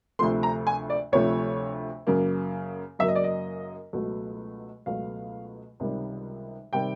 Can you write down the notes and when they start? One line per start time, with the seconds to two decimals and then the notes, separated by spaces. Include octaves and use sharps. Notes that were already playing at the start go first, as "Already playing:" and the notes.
0.19 D2 C3 F3 A3 C6
0.43 A#5
0.67 G#5
0.90 D5
1.12 D2 C3 F3 A3 C#5
2.07 F#2 C#3 F#3 A#3
2.99 F#2 C#3 F#3 A#3 E5
3.08 D#5
3.15 D5
3.24 D#5
3.93 C#2 B2 F#3 A3
4.86 C#2 B2 F#3 A3 F5
5.80 C#2 C3 D#3 G3
6.73 C3 D#3 G3 G5